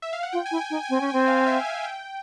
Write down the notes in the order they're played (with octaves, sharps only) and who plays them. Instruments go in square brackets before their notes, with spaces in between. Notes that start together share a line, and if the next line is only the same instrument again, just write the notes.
[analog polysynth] E5
F5
F#5
[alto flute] F4 [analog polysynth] G5
[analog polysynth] G#5
[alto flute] E4
[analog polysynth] G5
[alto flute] D#4
[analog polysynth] G#5
[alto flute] C4
C#4
[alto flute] C4 [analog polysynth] G5
[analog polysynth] F5
F5
E5
G#5
G5